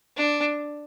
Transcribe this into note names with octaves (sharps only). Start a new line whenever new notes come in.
D4